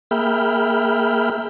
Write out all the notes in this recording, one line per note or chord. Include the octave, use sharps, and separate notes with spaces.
A#3 G#4 E5 G5 B5 F6